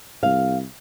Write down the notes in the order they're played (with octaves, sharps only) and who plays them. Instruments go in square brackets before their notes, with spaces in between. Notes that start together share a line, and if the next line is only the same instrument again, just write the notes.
[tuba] C2 [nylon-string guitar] F5